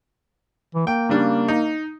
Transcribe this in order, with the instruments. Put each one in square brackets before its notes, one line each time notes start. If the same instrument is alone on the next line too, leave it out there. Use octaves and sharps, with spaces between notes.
[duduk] E3
[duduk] A#3 [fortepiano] G5
[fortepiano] C#3 G3 D4
D#4